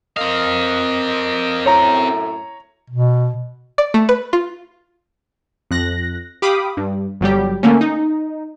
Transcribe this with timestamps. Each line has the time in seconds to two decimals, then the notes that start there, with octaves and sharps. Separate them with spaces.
0.17 C4 A#4 D5 D#5 F5
1.66 F#2 A2 C#5 A#5
2.90 B2
3.78 D5
3.94 A3
4.09 B4
4.33 F4
5.71 F2 F#6 A#6
6.42 G4 F5 B5 D6 D#6
6.77 G2
7.21 G1 F#3 G3 G4
7.63 D3 A3 A#3 C#4
7.81 D#4